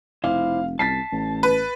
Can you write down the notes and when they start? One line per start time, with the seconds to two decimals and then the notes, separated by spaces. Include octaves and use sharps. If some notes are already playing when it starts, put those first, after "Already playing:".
0.24 F1 E4 C5 F5
0.79 C2 A5 A6 B6 C7
1.12 A1
1.43 B4